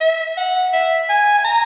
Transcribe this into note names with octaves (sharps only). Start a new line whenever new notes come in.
E5
F#5
E5
G#5
G#5
A#5